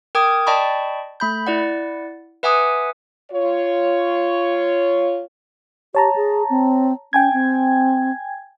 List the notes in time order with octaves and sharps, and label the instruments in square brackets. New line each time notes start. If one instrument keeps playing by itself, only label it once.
[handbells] A#4 G5 D6 D#6 G#6
D5 D#5 G5 A5 B5 C#6
A3 B5 G6
E4 D5 F#5
B4 E5 F#5 G#5 D6 D#6
[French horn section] F4 C#5
[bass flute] G4 [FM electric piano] C#5 A5 A#5
[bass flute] G#4
C4
[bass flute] C#4 [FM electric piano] G5 G#5 G#6
[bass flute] C4